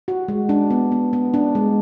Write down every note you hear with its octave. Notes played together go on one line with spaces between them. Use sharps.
F#4
G#3
D4
B3
B3
B3
D4
G#3